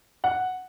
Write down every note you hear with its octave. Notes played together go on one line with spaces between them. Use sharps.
F#5